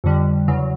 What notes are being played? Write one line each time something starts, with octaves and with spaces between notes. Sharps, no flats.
F2 D3 G3
E2 C#3 F#3